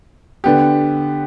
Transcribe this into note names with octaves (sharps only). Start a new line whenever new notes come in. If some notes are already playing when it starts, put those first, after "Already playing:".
D3 B3 G4